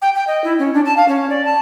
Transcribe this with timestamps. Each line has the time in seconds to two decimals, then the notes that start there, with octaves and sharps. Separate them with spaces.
0.02 G5
0.15 G5
0.27 D#5
0.44 E4
0.59 C#4
0.74 D4
0.85 A5
0.97 F5
1.09 C#4
1.30 D5
1.45 A5